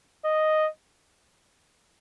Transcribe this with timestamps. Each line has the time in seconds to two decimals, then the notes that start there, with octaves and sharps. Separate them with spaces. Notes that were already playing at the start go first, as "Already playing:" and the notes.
0.25 D#5